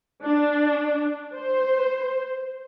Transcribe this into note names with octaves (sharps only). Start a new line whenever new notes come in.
D4
C5